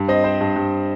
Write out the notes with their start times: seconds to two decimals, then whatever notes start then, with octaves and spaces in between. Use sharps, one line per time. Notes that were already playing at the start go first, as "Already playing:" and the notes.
Already playing: G2
0.08 C4 D#5
0.24 C4 C5
0.41 G2
0.56 G2